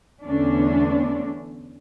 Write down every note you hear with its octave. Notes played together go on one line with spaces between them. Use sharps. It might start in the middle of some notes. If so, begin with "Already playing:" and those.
E2 D3 A3 C#4 D4